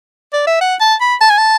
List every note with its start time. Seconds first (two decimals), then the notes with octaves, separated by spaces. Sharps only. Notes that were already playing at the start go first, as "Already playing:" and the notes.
0.33 D5
0.47 E5
0.61 F#5
0.81 A5
1.01 B5
1.21 A5
1.30 G#5
1.38 A5